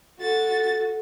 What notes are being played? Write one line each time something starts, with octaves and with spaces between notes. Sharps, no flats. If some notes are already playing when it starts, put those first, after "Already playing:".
F#4 A4 A6